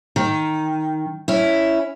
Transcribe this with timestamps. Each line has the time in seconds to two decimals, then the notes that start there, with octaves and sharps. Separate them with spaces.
0.16 D#3
1.28 C#4 E4